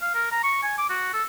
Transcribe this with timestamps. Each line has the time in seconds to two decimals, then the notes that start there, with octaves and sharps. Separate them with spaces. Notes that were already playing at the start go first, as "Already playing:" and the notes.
0.01 F5
0.15 A#4
0.32 A#5
0.43 C#6
0.63 G#5
0.78 D6
0.90 F#4
1.13 A4